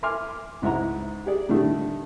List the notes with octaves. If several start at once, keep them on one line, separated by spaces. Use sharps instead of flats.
E5 G#5 C6 D6 F6
C#2 G#2 E4 E5 F#5 A#5
G4 G#4 D5
A2 D3 D#3 G3 A3